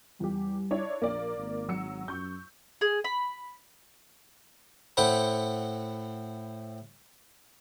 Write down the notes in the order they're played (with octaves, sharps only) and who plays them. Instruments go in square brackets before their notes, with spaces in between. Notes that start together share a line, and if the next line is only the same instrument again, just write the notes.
[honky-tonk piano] E2 G4 [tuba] G3
[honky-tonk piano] D4 E4 C#5
[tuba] A#1 [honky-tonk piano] A#3 D5
[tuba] G#1
[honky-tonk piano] F#3 E6 C#7
[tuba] F#2 [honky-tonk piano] C#6 G6
[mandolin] G#4
B5
[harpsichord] A2 C4 C5 F#5 B5